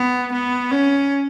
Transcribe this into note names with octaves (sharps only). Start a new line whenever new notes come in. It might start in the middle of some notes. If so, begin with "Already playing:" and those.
Already playing: B3
B3
C#4